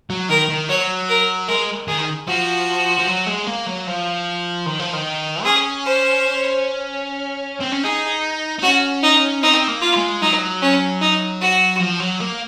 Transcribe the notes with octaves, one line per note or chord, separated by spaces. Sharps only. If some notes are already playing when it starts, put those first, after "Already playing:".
F#3
D#3 A#4
D#3
F#3 C#5
A#4
G#3 A#4
D#3 G#4
F3 F#4
F3
F#3
G#3
A#3
F#3
F3
D#3
F3
D#3
C#4 G#4
C5
C4
C#4
D#4 G#4
D#4
C#4 F#4
D#4
C4 D#4
A#3
F4
G#3
F#3 D#4
C#4
D#4
F#4
F3
F#3
A#3